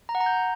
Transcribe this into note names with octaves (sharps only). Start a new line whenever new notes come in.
A#5
F#5
A#5
G6